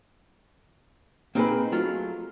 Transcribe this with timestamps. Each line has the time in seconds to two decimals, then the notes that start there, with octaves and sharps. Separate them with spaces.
1.35 A#3 C4 D#4 G4 G#4 B4
1.72 F#3 A3 F4